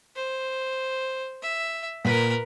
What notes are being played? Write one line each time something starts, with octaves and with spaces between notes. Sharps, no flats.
C5
E5
A#2 A#4 B4 F#5 B6